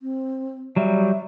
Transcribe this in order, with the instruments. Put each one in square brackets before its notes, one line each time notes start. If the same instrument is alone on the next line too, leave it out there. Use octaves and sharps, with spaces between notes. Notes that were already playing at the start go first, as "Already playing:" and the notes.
[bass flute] C4
[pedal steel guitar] F#3 G3 [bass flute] E5